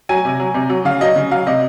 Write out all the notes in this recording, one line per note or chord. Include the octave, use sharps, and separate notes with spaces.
F#3 G#5
C3
F#3
C3
F#3
C#3 F5
F#3 D#5
C#3
F#3 F5
C3 D#5